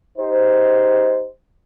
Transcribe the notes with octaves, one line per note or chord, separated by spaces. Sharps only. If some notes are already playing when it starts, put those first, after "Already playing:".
D#4 G4 C5